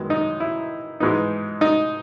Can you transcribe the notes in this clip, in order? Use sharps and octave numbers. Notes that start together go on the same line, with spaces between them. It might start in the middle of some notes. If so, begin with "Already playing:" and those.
Already playing: F#2 D#3 G#3 B3
D#4
E4
G#2 E3 G#3 B3 D#4
D#4